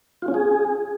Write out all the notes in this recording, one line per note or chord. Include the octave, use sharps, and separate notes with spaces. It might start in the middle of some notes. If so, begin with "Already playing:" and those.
F4
C#4
G#4